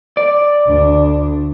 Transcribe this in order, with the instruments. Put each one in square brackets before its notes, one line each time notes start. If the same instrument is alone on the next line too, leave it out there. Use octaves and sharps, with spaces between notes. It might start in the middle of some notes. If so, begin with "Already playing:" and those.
[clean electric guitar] D5
[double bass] D2 D4